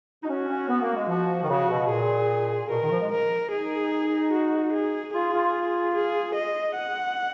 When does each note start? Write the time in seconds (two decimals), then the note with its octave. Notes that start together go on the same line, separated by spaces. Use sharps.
0.23 D#4
0.28 C#4 F#4
0.48 C#4
0.68 B3
0.82 A#3
0.95 G#3
1.08 F3 F#4
1.43 D#3
1.49 C#3 F#4
1.69 B2
1.90 A#2 G#4
2.70 B2 A#4
2.82 D#3
2.91 F3
3.01 G#3
3.12 A#4
3.51 D#4 G#4
4.33 F#4
4.73 G#4
5.13 F4 G#4
5.33 F4
5.95 G#4
6.35 D#5
6.76 F#5